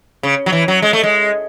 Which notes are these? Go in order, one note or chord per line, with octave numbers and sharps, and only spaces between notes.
C#3
F#3
E3
F#3
G#3
A3
G#3